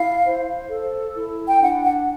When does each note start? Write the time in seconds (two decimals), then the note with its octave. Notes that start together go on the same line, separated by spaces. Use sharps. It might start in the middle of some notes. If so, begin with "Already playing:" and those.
Already playing: E4 F5
0.24 C5
0.70 A4
1.15 E4
1.50 G5
1.62 D4 F#5
1.84 F#5